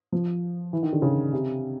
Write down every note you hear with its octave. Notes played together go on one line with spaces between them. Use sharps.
F3
E3
D#3
D3
C#3
C3